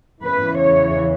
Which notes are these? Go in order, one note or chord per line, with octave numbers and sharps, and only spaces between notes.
E2 C#3 E3 B4
C#5